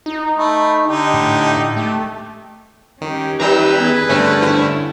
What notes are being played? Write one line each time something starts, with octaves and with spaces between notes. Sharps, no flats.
D#4
A3 B5
D3 D#4 G4
A2
A3 G4
D#3 C#4 G4
D#2 G3 B4 A#5 E6 G6
B3 G#4
G2 D3 A3 C4 C#4
E4